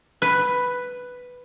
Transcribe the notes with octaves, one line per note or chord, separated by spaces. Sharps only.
B4